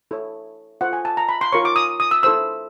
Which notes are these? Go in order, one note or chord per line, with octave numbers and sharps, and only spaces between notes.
E4 A4 C#5
F4 A4 C5 F#5
G#5
A5
A#5
B5
C6
F4 A#4 C#5 C#6
D6
D#6
D#6
E6
E4 A4 C5 E6